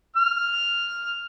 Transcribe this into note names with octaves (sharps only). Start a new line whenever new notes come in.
F6